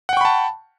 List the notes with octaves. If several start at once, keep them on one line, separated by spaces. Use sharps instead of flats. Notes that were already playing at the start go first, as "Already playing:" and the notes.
F#5 G5 A5 B5 C#6